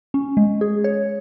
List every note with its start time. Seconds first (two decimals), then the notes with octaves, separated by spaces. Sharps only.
0.14 C#4
0.37 G#3
0.61 G#4
0.84 C#5